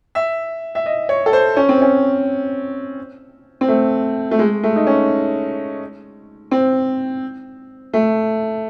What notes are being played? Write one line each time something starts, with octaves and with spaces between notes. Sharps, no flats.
E5
E5
D#5
C#5
A4
C5
C#4
C4
C#4
C4
A3
A3
G#3
A3
D#4
C#4
C4
A3